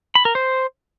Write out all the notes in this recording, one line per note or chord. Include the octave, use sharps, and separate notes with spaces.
B5
A#4
C5